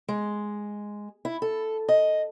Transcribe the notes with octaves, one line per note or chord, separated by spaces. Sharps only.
G#3
E4
A4
D#5